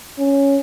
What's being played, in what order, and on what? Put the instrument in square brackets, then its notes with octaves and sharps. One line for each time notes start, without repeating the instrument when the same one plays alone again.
[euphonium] C#4